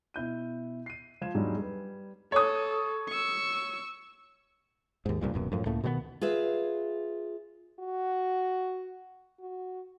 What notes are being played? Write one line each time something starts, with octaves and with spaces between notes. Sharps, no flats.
B2 E4 G6 D#7
C7 D#7
F3 G#6 E7
E2 G#2 F#3 G3 D4
G3 B4
A4 C#5 D#6
C#6 E6
D#2 G#2
C2 G2 A#2
D#1 F#2 B2
F#2 A2 F3
C#2 A2 A3 A#3
B2 D#3 G3 B3
F4 G#4 B4 E5
F#4
F#4